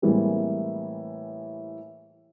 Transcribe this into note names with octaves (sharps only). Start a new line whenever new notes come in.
A2 E3 G3 G#3 A#3 C4